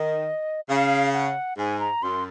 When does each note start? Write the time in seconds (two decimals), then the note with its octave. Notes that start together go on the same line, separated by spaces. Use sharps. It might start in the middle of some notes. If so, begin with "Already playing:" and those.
Already playing: D#3 D#5
0.69 C#3 F5
1.14 F#5
1.58 G#2 G#5
1.80 A#5
2.03 F#2 C6